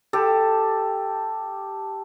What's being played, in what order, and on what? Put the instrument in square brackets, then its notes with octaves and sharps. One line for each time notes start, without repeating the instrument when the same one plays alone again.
[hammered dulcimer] G4 A4